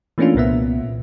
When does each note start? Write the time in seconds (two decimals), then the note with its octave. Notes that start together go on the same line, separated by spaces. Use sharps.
0.18 E3 A3 A#3 C#4 D4 F4
0.35 C2 A#2 A#3 B3 E5